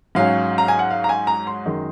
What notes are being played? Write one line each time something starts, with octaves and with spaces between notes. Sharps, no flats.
G#2 F#3 C#4 F5
A#5
G#5
F#5
F5
A#5
G#5
A#5
C6
F#2 D#3 G#3